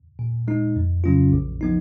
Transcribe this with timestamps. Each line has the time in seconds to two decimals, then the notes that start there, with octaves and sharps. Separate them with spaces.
0.19 A#2
0.48 G#3 D#4
0.76 F2
1.04 C#3 F#3 C#4 F4
1.33 A#1
1.61 F3 B3 D#4